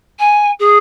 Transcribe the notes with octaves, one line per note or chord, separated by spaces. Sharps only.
G#5
G#4